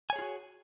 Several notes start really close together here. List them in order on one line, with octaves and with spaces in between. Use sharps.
G#5 C#5 G#4 F4 F#4